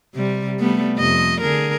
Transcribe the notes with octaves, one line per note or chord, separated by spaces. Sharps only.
C3 G3
G3 A3 B3
F2 C3 D#5
D3 G#4 A#4